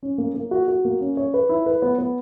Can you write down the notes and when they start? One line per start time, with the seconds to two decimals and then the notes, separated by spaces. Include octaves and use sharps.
0.03 C#4
0.18 A#3
0.34 A#3
0.51 F#4
0.68 F#4
0.85 A#3
1.01 C#4
1.17 C#5
1.34 B4
1.49 E4
1.66 B4
1.82 B3
1.98 B3